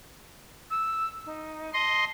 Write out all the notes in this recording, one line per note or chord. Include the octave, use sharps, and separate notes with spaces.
E6
D#4
D#5 A5 C6